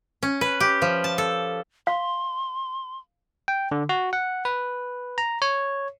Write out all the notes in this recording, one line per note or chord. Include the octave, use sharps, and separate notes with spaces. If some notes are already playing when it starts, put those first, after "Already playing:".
C#4
B4
G4
F3
A5
A4
F5 C6
G5
D3
F#4
F#5
B4
A#5
C#5